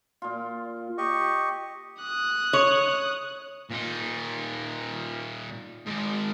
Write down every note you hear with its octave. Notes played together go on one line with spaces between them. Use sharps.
A#2 F4
G4 D#5 C#6
D#6 F#6
C#5
A#2 D#4
G#2 D#3